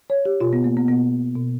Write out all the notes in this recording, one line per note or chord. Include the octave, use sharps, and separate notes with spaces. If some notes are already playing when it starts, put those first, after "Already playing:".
C#5
G4
B2 F4
B3
A#3
B3
B2 B3
B2